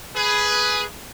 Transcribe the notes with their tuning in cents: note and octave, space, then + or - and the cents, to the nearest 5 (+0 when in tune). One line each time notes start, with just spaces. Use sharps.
G#4 +10 B4 +0